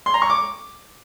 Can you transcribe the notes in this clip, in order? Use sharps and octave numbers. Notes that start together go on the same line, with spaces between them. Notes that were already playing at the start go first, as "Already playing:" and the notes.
C6
A#5
C#6
D6